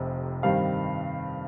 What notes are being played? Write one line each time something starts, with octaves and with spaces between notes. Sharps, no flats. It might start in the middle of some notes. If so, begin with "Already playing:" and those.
Already playing: F1 F2 C3
G2 D#3 G3 C4 F5